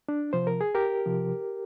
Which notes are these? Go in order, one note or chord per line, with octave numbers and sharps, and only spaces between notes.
D4
C3 F3 C5
A#4
G#4
G4 A#4
C3 F3